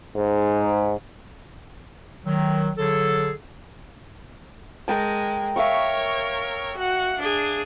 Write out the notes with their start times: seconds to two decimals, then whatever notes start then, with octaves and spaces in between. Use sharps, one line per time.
0.16 G#2
2.25 D#3 F#3
2.78 D3 F#3 G#4 A4
4.88 G#3 A#4 G5 A5
5.56 A#4 C#5 E5 F5 C#6
6.77 F#4 F#5
7.19 D4 G#4